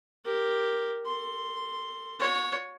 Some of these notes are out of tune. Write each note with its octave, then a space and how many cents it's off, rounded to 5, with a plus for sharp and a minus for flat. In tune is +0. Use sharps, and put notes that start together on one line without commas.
G4 +0 A#4 +0
A4 +35 C6 +0
F#4 -40 C#5 +0